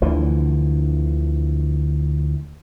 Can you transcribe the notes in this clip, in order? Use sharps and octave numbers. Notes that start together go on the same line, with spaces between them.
D2 D3 E3 F3